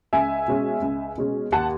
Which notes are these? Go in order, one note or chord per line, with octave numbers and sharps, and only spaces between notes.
C#2 E5 G#5
B2 G#3 C#4
C#2
B2 G#3 C#4
D#2 F#5 A5